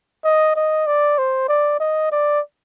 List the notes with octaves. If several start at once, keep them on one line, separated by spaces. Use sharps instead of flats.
D#5
D#5
D5
C5
D5
D#5
D5